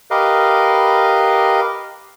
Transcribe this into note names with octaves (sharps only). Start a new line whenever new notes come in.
G4 A#4 B4 D#5 F5